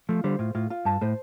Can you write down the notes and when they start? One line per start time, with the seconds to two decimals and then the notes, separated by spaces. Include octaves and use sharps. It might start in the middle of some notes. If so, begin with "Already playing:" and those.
0.09 F3 A3 F4
0.24 D3 G3 C5
0.39 A2 F4
0.55 A2 F4
0.70 F4
0.85 G2 A5
1.01 A2 C5